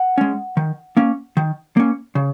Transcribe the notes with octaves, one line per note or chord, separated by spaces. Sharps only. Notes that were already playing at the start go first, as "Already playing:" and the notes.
Already playing: F#5
G#3 C#4
D#3
A#3 C#4
D#3
A#3 C#4
C#3